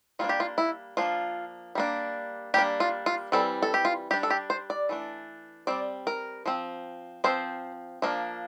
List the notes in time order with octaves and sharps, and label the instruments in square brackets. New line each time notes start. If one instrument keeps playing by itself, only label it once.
[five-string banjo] G3 A#3 D4 F4
G4
F4
E4
F3 A#3 D4 F4
G3 A#3 D4
G3 A#3 D4 G4
F4
F4
E3 G3 C4 A4
A4
G4
F4
G3 D4 G4
A4
G4
C5
D5
E3 A3 D4
G3 C4 D5
A#4
F3 C4
F3 C4 C5
F3 A#3 D4